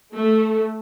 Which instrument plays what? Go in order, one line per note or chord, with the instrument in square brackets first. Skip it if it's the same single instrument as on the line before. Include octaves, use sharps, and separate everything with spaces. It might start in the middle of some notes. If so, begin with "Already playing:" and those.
[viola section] A3